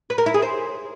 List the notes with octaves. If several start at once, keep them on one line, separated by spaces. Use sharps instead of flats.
B4
A#4
E4
G#4
C5